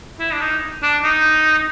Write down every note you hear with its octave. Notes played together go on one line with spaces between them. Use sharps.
E4
D4
D#4
D4
D#4